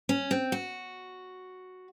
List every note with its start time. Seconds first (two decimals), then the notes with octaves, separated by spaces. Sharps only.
0.09 C#4
0.31 C4
0.52 F#4